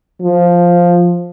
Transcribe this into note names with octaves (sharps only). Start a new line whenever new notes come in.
F3